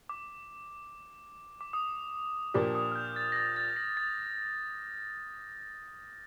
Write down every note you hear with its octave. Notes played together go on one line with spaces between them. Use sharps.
D6
D6
D#6
A#2 F3 A#3 D4 G4 D6
D#6
F6
G6
A6
A#6
A6
A6
A#6
A6